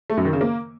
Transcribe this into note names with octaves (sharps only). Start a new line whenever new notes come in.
A3
F#2
D#3
C#3
A#3